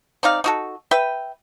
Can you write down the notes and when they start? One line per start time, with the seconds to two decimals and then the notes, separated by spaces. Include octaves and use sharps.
0.23 C4 D#4 D5 F5
0.44 D#4 F#4 A4
0.91 B4 E5 G5